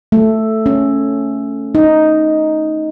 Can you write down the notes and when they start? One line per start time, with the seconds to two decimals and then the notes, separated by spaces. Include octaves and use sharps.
0.12 A3
0.66 C#4
1.75 D#4